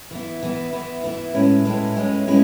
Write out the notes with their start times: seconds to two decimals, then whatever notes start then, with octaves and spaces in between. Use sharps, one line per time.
0.11 E3 B3 E4
0.43 E3 B3 E4
0.73 E3 B3 E4
1.04 E3 B3 E4
1.34 A2 G#3 C#4 E4 B4
1.65 A2 G#3 C#4 E4 B4
1.96 A2 G#3 C#4 E4 B4
2.27 A2 G#3 C#4 E4 B4